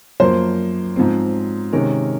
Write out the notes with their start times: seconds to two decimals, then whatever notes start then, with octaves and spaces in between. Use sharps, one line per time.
0.20 F#2 F3 A#3 C5
0.96 G#2 F3 C4
1.73 C3 D#3 G#3 C#4 A#4